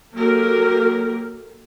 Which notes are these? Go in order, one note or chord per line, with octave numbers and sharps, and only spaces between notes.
F#3 A#3 G4 A4 A#4